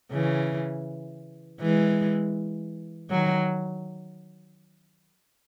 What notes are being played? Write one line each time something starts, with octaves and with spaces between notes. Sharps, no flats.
C#3 E3
E3 G#3
D#3 F#3